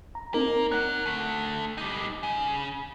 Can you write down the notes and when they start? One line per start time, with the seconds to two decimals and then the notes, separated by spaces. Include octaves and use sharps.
0.15 A#5
0.34 A#3 C4 D#4 A#4
0.72 C#5 F#5 F#6
1.05 D3 A3
1.78 G3 D#4
2.23 C#3